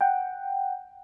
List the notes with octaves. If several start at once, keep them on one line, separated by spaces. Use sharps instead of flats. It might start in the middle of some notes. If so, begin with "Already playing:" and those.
F#5 G5